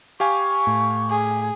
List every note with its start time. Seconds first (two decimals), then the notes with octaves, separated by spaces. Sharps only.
0.20 G4 F5 G#5 C#6
0.67 A2
1.10 G#4